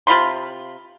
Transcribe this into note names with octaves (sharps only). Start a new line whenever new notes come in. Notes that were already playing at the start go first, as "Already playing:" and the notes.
C3 F4 B5 C6